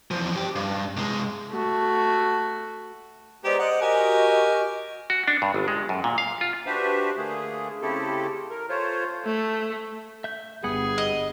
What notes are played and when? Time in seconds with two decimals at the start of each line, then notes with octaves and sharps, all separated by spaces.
0.11 E2 F3
0.35 G2 G4
0.55 G2
0.97 C2 G#3
1.51 A3 F#4
3.44 G#3 B3 G4 C5 D5 A#5
3.59 D#5 F#5
3.81 F#4 G4 A#4 D#5 G#5
5.10 F#4
5.28 D4
5.42 G2
5.54 G1
5.68 G#3
5.89 F#2
6.04 A#2
6.18 F5
6.41 F4
6.66 D4 F#4 G4 B4 C5 E5
7.17 D3 A3 A#3 G#4
7.82 C#3 A3 C4 E4 G4 A4
8.50 A#4
8.69 A3 F4 C5 C#5
9.25 A3
10.24 E5 G6
10.64 G1 G2 G3 B3 G#4 F#5
10.98 D#5